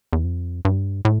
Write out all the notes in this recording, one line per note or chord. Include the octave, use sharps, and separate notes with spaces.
E2
F2
G2
A2